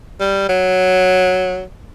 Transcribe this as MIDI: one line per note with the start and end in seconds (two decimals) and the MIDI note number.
0.20 0.48 55
0.49 1.64 54